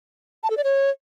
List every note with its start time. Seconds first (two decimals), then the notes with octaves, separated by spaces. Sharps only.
0.43 A5
0.50 A4
0.57 D5
0.64 C#5